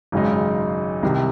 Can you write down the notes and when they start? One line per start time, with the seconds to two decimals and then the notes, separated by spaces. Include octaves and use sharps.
0.12 G#1 F#2 C#3 G#3 D#4
1.03 C2 C3 D#3